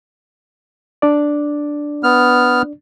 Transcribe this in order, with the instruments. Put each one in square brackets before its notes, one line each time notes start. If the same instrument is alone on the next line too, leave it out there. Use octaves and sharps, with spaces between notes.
[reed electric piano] D4 D5
[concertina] B3 F6